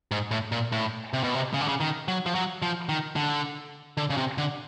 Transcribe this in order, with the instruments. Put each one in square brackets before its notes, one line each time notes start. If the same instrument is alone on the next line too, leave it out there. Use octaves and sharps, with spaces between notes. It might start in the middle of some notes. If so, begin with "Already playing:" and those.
[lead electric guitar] G#2
A2
A#2
A2
C3
B2
C3
C#3
D3
C#3
D#3
F#3
F3
F#3
F3
D#3
D3
D3
C#3
C3
D3